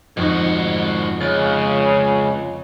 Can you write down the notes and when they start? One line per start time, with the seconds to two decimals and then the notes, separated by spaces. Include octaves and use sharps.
0.17 F2 G#2 D#4 F#4
1.21 C#2 C#3 A6